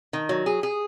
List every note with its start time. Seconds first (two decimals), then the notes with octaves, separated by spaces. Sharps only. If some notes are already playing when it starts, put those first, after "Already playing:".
0.13 D#3
0.29 F#3
0.46 G#4
0.63 G#4